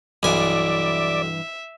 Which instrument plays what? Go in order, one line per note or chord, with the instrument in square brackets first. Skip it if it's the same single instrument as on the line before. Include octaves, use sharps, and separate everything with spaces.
[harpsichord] B1 G#5 [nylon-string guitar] G2 E3 [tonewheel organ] D5 [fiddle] E5